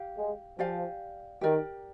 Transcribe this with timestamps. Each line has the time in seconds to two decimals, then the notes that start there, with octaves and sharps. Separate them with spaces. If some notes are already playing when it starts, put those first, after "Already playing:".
Already playing: G4 F5
0.18 G#3
0.58 F3 G4 D5 F5 G#5
1.41 D#3 G4 A#4 D5